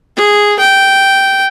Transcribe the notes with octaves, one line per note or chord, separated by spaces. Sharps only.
G#4
G5